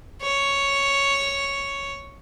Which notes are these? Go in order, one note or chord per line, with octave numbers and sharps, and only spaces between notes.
C#5